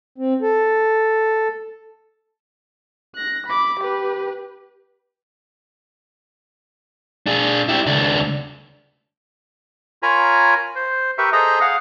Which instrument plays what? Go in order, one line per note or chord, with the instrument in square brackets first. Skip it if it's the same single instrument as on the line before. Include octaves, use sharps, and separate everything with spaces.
[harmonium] C4
A4
[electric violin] F#6 A#6
B5 D6
G4 B4
[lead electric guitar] D4 G#4
E4 G4
C#2 D4
[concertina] F4 A#4 C#5 G#5 A#5 B5
C5
G4 A#4 B4 E5 C#6
G#4 A4 C5 D#5 E5 A#5
G#4 F5 F#5